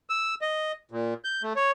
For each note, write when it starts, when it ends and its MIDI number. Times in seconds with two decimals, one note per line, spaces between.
0.10 0.35 88
0.41 0.72 75
0.91 1.14 46
1.24 1.42 91
1.43 1.53 57
1.56 1.71 73